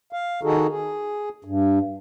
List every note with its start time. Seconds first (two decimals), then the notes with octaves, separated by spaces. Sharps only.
0.13 F5
0.43 D#3 D#4 F#4 G#4 A4
0.69 G#4
1.45 G2